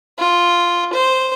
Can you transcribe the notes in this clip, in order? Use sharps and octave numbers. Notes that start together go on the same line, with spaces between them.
F4
C5